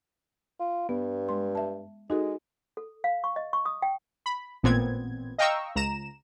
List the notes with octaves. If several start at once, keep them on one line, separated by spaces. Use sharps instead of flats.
F4
G2 B3
G#3 C6
E5 A5
G#3 D#4 F#4 A4
A4
F5
C#6
D#5
C#6
D#6
G5
B5
A1 A#2 B3 C4 G#6
D#5 F5 G5 A#5 C#6 E6
C#2 A#5 E7